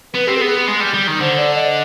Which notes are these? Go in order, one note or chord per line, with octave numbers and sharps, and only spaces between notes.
B3 B4
C4 G4
B4
B3 G#4
G#3
G3
G3
D#3
D3 C5
D5
D#5